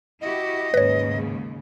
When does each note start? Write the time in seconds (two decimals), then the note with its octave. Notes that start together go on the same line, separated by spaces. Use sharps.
0.21 E4 F#4 G4 D#5
0.74 D#2 G#2 C#3 B4 C#5